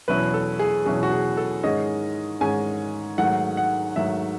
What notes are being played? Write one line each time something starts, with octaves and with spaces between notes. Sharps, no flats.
E2 B2 F#3 C#4 E4 B4
A4
G#4
E2 B2 F#3 C#4 E4 G#4
F#4
G#4
A4
G#2 D#3 G#3 C#4 D#5
G#2 D#3 G#3 C#4 G#5
G#2 D#3 F#3 A3 F#5
F#5
G#2 D#3 F#3 A3 E5